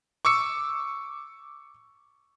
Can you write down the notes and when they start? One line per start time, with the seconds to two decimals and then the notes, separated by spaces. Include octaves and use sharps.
0.25 C#6 D6 E6 C#7